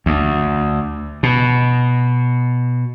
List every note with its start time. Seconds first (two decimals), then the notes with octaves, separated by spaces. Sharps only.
0.06 D2
1.23 B2